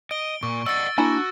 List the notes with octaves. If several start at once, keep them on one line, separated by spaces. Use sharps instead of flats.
D#5 D7 G7
A#2 C#6
D5 D#5 F#5 E6 A6
A#3 D4 E4 F#4 G#5